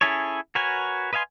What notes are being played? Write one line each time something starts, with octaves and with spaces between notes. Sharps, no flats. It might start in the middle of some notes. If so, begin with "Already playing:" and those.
C#4 E4 G#4 A4 C#5
F#4 A#4 B4 C#5 G#5
B4 D#5 F5 G#5 C6